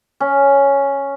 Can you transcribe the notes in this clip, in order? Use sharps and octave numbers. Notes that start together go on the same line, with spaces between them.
C#4